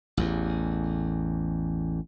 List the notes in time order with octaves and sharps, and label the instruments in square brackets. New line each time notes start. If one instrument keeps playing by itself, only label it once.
[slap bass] A1 E2